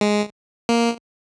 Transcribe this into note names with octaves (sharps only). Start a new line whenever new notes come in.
G#3
A#3